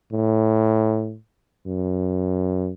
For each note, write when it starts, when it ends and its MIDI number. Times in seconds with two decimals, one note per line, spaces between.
0.12 1.16 45
1.67 2.72 42